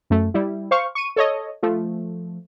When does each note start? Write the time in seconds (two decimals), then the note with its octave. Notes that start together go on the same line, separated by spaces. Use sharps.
0.10 F#2 A3
0.34 G3 E4
0.71 C5 F5 C#6
0.95 C#6 D#7
1.16 A4 C#5 D#5
1.63 F3 A3